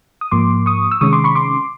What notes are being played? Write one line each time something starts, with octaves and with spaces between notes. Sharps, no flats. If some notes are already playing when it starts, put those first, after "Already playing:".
D#6
G#2 F3 A#3 C6 D6
C#6 D#6
E6
C3 D#3 G#3 C#4 C#6 D#6
C6 D6
B5 C#6
C6 D6